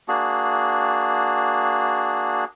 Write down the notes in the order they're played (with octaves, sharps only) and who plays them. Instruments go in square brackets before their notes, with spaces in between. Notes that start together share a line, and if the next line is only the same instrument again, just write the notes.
[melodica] A#3 D4 F#4 G#4